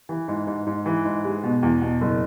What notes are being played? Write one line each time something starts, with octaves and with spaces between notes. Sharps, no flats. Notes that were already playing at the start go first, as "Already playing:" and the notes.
E3
G#2
G#2
G#2
E3
G#2
G#3
B2
E2
B2
F#1